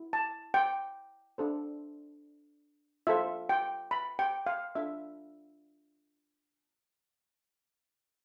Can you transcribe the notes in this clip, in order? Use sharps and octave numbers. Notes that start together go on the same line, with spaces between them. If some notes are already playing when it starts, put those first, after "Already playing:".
Already playing: E4
A5
G5
D4 A4 C5
F4 A4 C5 E5
G5
B5
G5
F5
D4 F4 A4 E5